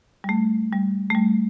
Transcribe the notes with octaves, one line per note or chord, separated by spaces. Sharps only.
G3
A3
G3
A3
G3